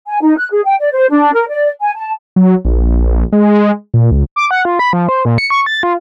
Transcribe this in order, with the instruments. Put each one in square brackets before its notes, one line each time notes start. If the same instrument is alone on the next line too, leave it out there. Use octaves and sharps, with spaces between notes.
[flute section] G#5
D#4
F#6
G#4
G5
D5
C5
D4
A#4
D5
G#5
A5
[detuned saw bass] F#3
A#1
G#3
A#2
C#2
[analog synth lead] D6
F#5
F4
B5
F3
C5
A#2
C#7
C#6
A6
F4